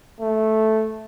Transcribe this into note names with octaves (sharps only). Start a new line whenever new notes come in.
A3